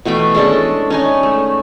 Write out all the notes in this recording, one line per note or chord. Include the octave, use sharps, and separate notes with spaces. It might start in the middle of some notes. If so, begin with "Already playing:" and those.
B2 E3 A3 G5
G#3 C#4 D4 A4
C#4 D#4 G#5
A3